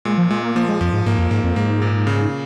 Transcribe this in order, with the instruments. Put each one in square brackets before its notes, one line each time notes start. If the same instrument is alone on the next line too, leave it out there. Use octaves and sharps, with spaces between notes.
[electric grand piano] A#2 [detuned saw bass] G#3
[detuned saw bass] F3
[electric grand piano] A#2 [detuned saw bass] G#3
[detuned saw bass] A#3
[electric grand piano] F3 [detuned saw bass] A#3
[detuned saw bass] G#3
[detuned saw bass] F2 [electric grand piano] F3
[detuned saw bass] G#2
[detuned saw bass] G#2 [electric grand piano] A#3
[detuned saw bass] F2
[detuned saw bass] G#2 [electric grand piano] A#3
[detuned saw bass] F2
[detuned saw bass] G#2 [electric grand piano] A#3
[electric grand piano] A#2
C#3